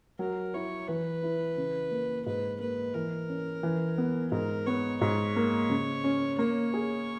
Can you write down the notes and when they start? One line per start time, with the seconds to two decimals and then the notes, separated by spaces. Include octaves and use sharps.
0.19 F#3 A#4
0.54 E4 C#5
0.88 E3 B4
1.23 E4
1.57 C#3
1.91 A#3
2.26 G#2 B4
2.60 A#3 B4
2.94 E3 A#4
3.29 C#4
3.63 E3
3.98 B3
4.32 G#2 A#4
4.67 B3 C#5
5.01 G#2 C#5
5.36 A#3
5.70 C#3
6.04 C#4
6.38 A#3 C#5
6.74 G#4